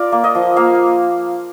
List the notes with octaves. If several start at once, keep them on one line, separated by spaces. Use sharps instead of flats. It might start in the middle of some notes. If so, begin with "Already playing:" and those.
Already playing: F4 A#4 D5
A#3
D#5
F3
A#3 F5